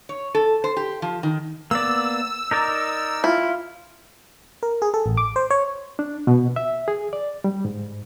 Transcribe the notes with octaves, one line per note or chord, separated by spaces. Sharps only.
C#5
A4
C5
G4
F3
D#3
A#3 B3 D5 E6
D#4 A#4 D5
E4 F4
A#4
G#4
A4
A1
D6
C5
C#5
D4
B2
E5
G#4
D5
G3
G#2